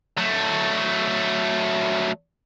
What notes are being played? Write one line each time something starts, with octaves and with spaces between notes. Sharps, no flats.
F#3 A3